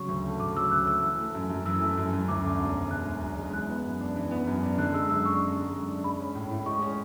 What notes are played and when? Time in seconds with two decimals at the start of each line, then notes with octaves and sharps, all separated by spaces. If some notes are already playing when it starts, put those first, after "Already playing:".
Already playing: C#3 F#3 C#6
0.08 D2
0.25 A3
0.40 C#3 D6
0.56 F#3 E6
0.71 D2 F#6
0.87 A3 E6
1.04 E3
1.18 A3
1.35 F#2
1.50 F#2
1.66 E3 E6
1.81 A3
1.97 F#2
2.13 F#2
2.28 D2 D6
2.44 D3
2.59 E1
2.75 G#3
2.91 D2 F#6
3.06 D3
3.23 E1
3.38 G#3
3.53 E3 F#6
3.70 B3
3.85 F#2
4.00 D4
4.16 E3
4.31 B3
4.47 F#2
4.63 D4
4.78 D3 F#6
4.94 G#3 E6
5.10 F#2 E6
5.26 D4 C#6
5.41 D3
5.57 G#3
5.73 F#2
5.88 D4
6.04 G#3 B5
6.20 C#4
6.35 A2
6.51 A2
6.66 G#3 C#6
6.82 C#4